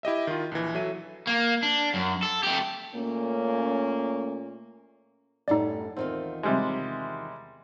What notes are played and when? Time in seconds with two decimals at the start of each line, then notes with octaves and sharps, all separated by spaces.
0.03 E4 G4 D#5 E5
0.27 D#3 F4
0.51 A#1 E3
0.75 F#3 A4 E5 D#7
1.27 A#3
1.63 D4
1.94 F#2
2.23 A4
2.43 A3 G4
2.94 A#2 A3 A#3 C#4
5.48 F#2 A2 G3 D#4 D5
5.97 E2 D#3 C4 F4
6.43 C3 G3 G#3